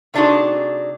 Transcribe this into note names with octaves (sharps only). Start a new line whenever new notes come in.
C3 A3 D4 D#4 F#4 G#4